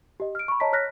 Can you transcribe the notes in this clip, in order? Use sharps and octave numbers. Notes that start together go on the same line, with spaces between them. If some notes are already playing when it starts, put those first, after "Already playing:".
G4 D#5
F6 D7
B5 C#6
C#5 D#5 A5 A#5 B6
C#5 F6 F#6 A#6 B6